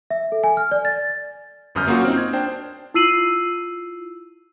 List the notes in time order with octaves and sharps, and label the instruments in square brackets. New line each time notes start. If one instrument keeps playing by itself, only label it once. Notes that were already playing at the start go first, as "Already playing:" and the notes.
[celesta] E5
A4
G#5
F6
D5
A6
[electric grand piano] G1 F#2 D#6 F6 G6
A#3 C#4 F4 F#4
C4 D#4
G#6
D4 C5 G5
[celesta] E4 F4 E6 C7 D#7 F#7